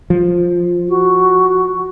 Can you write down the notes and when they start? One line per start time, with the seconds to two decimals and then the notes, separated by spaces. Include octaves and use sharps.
0.10 F3
0.89 F#4